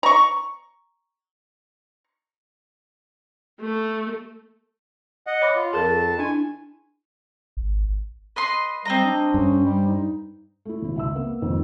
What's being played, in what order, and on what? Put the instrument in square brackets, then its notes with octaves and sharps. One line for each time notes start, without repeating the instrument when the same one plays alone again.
[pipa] A#5 C#6
[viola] A3
[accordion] D#5 F#5
[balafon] C#5 B5 D6
[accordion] F4
[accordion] F2 A5 [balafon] G#4 A#4
[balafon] D4 E4 [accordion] G#5
[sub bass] G#1
[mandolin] B4 D#5 C6
[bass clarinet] G3 [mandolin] C4 D#5 A#5
[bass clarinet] D4
[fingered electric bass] G2 [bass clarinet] C#4
[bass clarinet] G3
D#4
[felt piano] A3 E4
G#1 E4
C#2 E5 E6
A#3 B3
F2 G#2 D#3